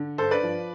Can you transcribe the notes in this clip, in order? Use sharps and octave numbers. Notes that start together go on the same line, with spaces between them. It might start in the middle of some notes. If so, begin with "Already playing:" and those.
Already playing: D3
G2 A4 C5
B4 D5
F3